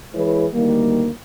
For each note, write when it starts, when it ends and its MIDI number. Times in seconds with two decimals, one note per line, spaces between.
0.14 0.46 52
0.14 0.46 56
0.14 0.46 64
0.14 0.46 68
0.14 0.46 71
0.14 0.46 73
0.54 1.08 38
0.54 1.08 51
0.54 1.08 55
0.54 1.08 58